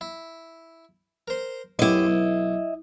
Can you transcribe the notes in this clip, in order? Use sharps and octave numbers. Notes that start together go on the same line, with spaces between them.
E4
A#4 C5
B1 F#2 E4 G4 D#5
B1